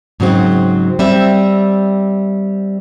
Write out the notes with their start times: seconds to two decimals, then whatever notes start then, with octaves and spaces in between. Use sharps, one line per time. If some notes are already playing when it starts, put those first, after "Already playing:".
0.20 G#2 C#3 F#3 C4
0.99 G3 C4 E5